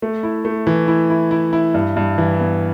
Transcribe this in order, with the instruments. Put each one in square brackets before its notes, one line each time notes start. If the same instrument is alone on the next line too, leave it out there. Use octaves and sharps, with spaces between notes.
[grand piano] A3
E4
A3
E3
E4
E4
E4
E4
G2
G2
E3
B3